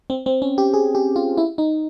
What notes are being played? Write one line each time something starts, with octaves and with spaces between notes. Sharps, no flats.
C4
C4
C#4
G4
G#4
G4
F4
E4
D#4